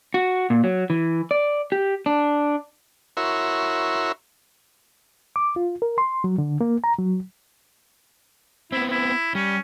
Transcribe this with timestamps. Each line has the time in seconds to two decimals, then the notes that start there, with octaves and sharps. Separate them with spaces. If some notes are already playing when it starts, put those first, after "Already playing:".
0.14 F#4
0.50 A#2
0.64 F#3
0.90 E3
1.31 D5
1.72 G4
2.06 D4
3.17 E4 F#4 A#4 C#5 E5 C6
5.36 D6
5.56 F4
5.82 A#4
5.98 C6
6.24 F#3
6.38 D3
6.61 A#3
6.84 A#5
6.98 F#3
8.72 B3 C4 E4
8.91 E4
9.35 G3 C#4